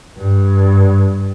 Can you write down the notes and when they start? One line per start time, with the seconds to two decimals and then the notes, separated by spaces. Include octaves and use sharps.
0.18 G2